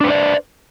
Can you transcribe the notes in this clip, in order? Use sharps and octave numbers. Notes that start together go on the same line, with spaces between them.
D4 B4 C5 D5